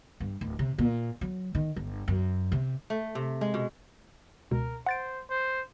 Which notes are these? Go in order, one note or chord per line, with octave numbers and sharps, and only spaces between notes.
G2
D1
C3
A#2
F#3
D#3
G1
F#2
C3
A3
C3
G#3
B2
C#2 B2 A#4
C5 F#5 A6 D7
C5